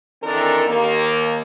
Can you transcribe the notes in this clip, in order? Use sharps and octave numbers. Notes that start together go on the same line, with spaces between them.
D#3 E3 C4 D4 A4 A#4
D#2 D#3 A#3